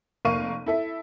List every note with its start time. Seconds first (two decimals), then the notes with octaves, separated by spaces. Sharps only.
0.25 F1 A#3 F5 C#6 D#7
0.66 E4 A4 E5